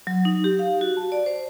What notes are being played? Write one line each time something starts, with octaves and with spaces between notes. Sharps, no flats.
F#3
D#4
G4
F5
F#4
A5
D5
C5